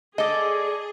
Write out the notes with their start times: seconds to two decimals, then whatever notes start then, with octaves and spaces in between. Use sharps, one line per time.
0.18 G#4 A4 D5 D#5